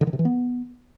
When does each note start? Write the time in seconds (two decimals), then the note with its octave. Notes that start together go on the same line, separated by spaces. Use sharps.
0.01 D3
0.07 D#3
0.13 C3
0.19 E3
0.25 B3